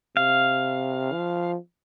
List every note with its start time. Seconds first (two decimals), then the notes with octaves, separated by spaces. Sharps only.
0.16 C3 F5
1.12 F3